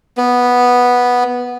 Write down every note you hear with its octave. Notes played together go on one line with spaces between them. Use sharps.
B3